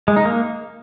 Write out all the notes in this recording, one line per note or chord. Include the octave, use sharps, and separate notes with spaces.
G#3
D#4
A#3